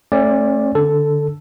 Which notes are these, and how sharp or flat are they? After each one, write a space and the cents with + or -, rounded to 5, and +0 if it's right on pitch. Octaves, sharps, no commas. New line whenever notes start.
A3 +0 C#4 -35 D5 +0
D3 +0 A4 +0